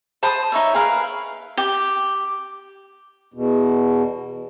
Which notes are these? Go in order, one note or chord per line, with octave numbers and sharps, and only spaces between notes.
C5 A5 B5 D#6
D#4 C#5 E5
G#4 A#4 B4 F5
G4
E2 B2